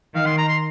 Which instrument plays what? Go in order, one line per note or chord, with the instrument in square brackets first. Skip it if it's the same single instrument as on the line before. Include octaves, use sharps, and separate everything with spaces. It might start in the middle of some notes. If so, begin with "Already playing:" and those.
[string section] D#3 [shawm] F5
[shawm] C6
A#5
C6